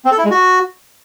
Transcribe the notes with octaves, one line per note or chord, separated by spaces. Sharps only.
C4
A4
E4
G#3
F#4